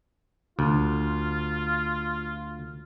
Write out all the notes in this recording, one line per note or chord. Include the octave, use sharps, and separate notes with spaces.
D2 F4